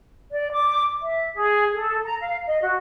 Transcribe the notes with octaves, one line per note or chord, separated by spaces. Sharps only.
D5
D6
E5
G#4
A4
A#5
F5
D#5
F#4